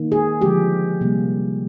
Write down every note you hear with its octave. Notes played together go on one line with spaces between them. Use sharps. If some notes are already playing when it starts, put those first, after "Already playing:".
Already playing: D#3 A#3
G#4
D3 F3 G#3 G4
C3 G3 A#3